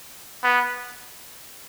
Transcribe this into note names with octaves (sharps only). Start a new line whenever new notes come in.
B3